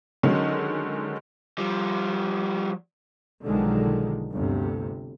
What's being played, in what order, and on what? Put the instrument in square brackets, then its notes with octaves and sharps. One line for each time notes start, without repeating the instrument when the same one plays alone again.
[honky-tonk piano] D3 D#3 F#3 G#3 C#4
[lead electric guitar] F3 G3
[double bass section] B1 D3 D#3 F3 G#3
G1 D2 G2 C3